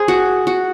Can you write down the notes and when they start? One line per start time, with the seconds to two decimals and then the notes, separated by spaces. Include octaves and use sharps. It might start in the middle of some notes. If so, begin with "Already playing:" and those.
Already playing: G#4 C5
0.08 F#4
0.47 F#4